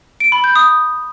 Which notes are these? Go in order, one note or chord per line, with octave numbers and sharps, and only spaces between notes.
D7
B5
G6
D#6